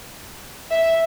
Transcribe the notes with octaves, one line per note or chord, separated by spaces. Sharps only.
E5